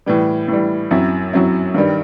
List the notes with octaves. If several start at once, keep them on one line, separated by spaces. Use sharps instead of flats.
A2 E3 G3
A2 E3 G3
F#2 F#3 C4 E4
F#2 F#3 C4 E4
G2 D#3 G3